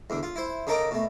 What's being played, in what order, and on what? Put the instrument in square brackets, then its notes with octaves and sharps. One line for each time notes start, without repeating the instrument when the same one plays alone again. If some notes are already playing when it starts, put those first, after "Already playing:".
[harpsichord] E2 D3
F4
E4 C5
C#3 D#4 A4 A#4 D#5 D6
B2 A3